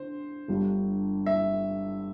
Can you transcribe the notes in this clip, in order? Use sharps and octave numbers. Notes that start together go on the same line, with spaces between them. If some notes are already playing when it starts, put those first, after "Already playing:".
Already playing: D3 C5
G1 G2 D3
E5